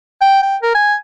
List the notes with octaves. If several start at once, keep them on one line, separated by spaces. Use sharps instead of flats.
G5
G5
A#4
G#5